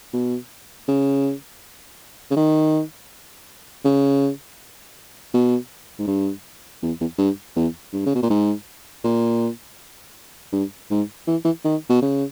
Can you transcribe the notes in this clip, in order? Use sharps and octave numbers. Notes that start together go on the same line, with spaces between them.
B2
C#3
C#3
D#3
C#3
B2
G#2
G2
E2
E2
G2
E2
G2
C#3
B2
A#2
G#2
A#2
G2
G#2
E3
E3
D#3
B2
C#3